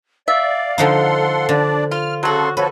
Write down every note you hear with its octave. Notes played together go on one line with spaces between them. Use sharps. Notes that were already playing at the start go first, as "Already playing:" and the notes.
D5 E5 F5
D3 F3 D#4 A4 F#5 C6
D3 D4 D5
F4 F6
C#3 F#3 F#4 A4 C6
F3 F#4 A4 B4 C#5